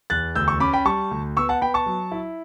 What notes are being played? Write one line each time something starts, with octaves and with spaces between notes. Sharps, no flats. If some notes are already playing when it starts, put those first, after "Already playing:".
E2 F#6 A6
D2 E6 G6
C#6 E6
C#4 B5 D6
G5 B5
G3 A5 C#6
D2
B3 C#6 E6
F#5 A5
B3 G5 B5
A5 C#6
F#3
E4